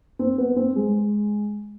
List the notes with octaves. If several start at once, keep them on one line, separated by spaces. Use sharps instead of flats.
C4
B3
C4
G#3